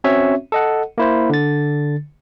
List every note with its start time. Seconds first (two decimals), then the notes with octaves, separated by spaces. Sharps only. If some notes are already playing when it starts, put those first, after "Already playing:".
0.04 C4 C#4 F#4 C#5 E5
0.52 A4 D#5 F#5
0.98 A#3 E4 C5
1.30 D3 A6